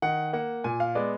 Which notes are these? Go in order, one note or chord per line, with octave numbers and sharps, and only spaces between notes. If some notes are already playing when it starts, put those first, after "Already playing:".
D#3 F#5
A#3 F#5
A#2 G#5
F5
G#3 B3 D5